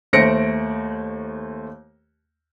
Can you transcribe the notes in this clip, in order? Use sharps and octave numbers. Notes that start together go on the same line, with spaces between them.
D#2 A3 C5 A#6 C#7 D7